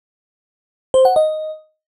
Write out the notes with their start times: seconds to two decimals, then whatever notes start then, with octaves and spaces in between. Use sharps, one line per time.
0.94 C5
1.05 F#5
1.16 D#5